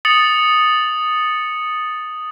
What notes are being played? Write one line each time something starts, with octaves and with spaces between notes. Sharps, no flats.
D#6 A6 C#7 F#7